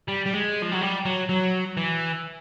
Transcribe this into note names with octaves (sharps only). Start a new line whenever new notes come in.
G3
G3
G#3
F3
F#3
G3
F#3
F#3
E3